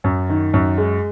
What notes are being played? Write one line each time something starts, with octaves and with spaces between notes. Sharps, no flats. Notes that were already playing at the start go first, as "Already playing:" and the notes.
F#2
D#3
F#2
G#3